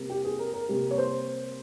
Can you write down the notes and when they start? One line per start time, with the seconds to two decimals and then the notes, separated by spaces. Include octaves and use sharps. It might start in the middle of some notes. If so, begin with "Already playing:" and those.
Already playing: C3 G3 A#3
0.10 G4
0.24 G#4
0.39 A#4
0.54 A#4
0.68 C3 G3 A#3
0.91 C#5
0.98 C5